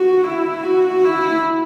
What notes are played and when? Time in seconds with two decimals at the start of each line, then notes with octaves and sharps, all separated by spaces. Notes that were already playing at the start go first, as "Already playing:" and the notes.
Already playing: F#4
0.24 E4
0.63 F#4
1.04 E4